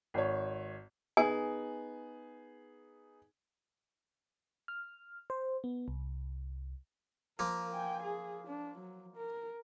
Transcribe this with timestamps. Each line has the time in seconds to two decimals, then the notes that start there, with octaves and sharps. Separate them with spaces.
0.14 G#1 C#5
1.17 B3 D#4 G#4 G#5
4.68 F6
5.30 C5
5.64 B3
5.88 C2
7.39 F3 A#3 A#4
7.73 G5 G#5
8.03 G#4
8.47 D4
8.78 F#3
9.16 A#4